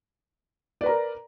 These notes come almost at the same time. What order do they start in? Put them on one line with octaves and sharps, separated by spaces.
D5 B4 A#5 A#4